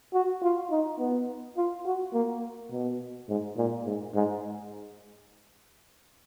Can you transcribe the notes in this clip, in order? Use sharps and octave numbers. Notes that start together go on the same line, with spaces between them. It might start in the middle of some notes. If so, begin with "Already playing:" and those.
F#4
F4
D#4
B3
F4
F#4
A#3
B2
G#2
A#2
G#2
G#2